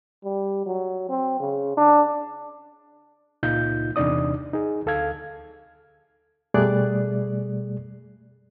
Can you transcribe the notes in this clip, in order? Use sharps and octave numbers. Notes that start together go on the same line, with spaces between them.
G3
F#3
C4
C#3
D4
C#2 A#2 D#4 F4 G6
E2 C3 D4 D#4 D5 D#6
D#4 G#4
D2 A4 F5 G#6
B2 G3 A3 G#4 D5 F#6